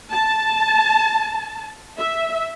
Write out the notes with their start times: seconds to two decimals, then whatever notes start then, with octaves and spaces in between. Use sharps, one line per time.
0.11 A5
1.99 E5